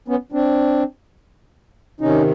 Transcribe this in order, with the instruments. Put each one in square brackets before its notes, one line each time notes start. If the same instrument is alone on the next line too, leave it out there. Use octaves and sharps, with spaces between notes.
[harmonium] B3 C#4
C4 D4
C3 D#3 C#4 D#4